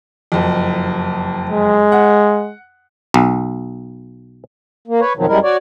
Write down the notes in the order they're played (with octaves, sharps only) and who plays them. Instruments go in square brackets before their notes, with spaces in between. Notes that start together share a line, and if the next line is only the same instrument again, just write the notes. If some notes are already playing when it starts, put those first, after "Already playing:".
[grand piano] F#1 F2
[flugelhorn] G#3
[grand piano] F#5
[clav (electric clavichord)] B1
[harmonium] A#3
B4 C#5
F2 B2 D#3 F3 F#3
F#2 G3 G#3 E4 A#4
F#4 C#5 D5